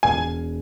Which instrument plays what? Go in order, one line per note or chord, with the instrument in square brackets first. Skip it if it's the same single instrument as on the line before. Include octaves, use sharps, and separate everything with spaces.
[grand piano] E1 [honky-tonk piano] G#5